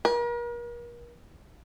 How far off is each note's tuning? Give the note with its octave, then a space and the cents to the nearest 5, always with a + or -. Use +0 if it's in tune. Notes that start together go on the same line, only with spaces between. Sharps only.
A#4 +40